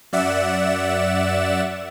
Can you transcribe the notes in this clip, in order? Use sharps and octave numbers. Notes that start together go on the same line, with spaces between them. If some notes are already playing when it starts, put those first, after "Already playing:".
F#2 D5 E5 F#5 E7